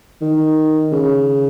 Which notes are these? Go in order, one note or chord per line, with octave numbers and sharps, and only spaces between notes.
D#3
C#3